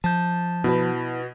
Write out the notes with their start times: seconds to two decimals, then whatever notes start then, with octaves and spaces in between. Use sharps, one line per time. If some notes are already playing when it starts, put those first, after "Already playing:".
0.04 F3 A5 G6
0.64 B2 E4 F#4 B4